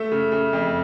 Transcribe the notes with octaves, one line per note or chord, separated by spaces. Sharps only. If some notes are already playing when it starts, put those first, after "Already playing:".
Already playing: A3 E5
C#3
C#3
F2